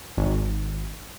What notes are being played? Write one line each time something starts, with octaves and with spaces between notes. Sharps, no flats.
G#1